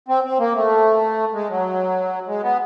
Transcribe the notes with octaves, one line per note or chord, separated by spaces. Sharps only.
C4
C4
A#3
A3
G#3
F#3
G#3
B3